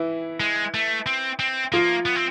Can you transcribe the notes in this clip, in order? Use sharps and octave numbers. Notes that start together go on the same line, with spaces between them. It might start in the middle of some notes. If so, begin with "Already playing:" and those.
Already playing: E3 E4
G#3
A3
C4
C4
F3 A#3 F4
B3
C4